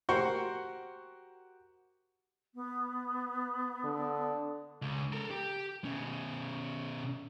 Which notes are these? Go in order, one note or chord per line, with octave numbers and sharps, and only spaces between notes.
F#4 G4 A#4 C5 C6 C#6
B3
D3
C#2
A4 A#4
G4
B2 C#4